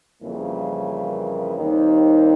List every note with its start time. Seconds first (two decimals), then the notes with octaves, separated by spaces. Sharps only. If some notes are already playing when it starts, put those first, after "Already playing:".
0.22 F2 C#3 E3 G3 A#3
1.57 D#2 D#3 G3 C4 D#4